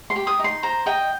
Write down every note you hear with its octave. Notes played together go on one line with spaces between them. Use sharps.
C6
G4
D#6
D#4
C6
C5 A#5
D#5 G5